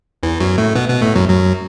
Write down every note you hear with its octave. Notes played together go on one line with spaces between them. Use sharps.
E2 E3
F#2 F#3
A2 A3
B2 B3
B2 B3
A2 A3
F#2 F#3
F#2 F#3